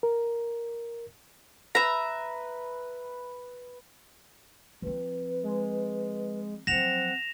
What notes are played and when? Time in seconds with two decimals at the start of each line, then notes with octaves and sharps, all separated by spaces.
0.03 A#4
1.75 B4 E5 A#5
4.82 F3 C4 B4
5.43 G#3
6.67 F3 F#3 C4 F#5 A#6 E7 F7